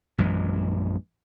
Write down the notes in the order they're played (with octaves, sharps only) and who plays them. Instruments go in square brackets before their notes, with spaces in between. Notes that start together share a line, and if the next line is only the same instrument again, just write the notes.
[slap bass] A#1 F#2 E3 G#3